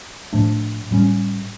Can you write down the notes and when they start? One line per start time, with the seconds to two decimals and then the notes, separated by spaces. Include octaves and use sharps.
0.33 A2 F3 A3 D4
0.91 A2 G3 A#3 C#4